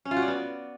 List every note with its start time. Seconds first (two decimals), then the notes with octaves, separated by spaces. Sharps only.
0.05 C#4
0.11 F4
0.17 F#4
0.22 D5
0.28 B3